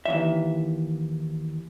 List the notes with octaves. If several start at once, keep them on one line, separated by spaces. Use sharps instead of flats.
D#2 E3 E5